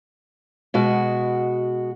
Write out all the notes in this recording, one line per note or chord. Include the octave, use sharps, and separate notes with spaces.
B2 G#3 F#4